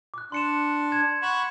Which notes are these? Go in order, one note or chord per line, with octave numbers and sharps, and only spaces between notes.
D6 F#6
D4 C6 C#7 E7
G#6 E7
F#5 B5 C#6 E7